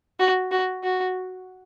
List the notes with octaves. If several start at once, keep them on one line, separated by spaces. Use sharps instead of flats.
F#4
F#4
F#4